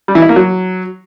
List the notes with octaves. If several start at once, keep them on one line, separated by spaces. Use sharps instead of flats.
G3
E3
E4
A#3
F#3